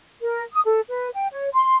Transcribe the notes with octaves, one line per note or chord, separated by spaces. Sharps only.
A#4
D#6
A4
B4
G5
C#5
C6